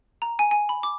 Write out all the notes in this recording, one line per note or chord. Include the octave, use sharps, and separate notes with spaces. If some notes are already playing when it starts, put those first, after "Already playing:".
A#5
G#5
G#5
B5
D6